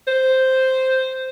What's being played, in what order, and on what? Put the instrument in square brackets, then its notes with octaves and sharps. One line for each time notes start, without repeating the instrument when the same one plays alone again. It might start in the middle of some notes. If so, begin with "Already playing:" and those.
[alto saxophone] C5